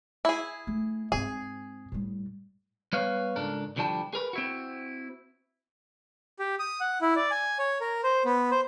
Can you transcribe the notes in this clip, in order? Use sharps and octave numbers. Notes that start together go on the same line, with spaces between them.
E4 G#4
A3
G#2 C4 G#4
A2 G3
G3 B3 B4 C#5 F5
C#2 G#2 D4 A4 A#4
C2 D3 F3 G3 A5
G#4 A#4 B4
C4 E4 F#4
G4
D#6
F#5
E4
D5
G#5
C#5
A#4
C5
B3
C5